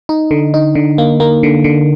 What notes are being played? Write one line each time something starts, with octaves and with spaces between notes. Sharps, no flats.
D#4
D3
D#4
D3
A#3
A#3
D3
D3